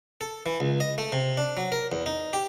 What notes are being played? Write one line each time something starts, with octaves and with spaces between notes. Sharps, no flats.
A4
E3
C#2
D#5
A3
C3
D4
F#3
A#4
E2
D#4
G4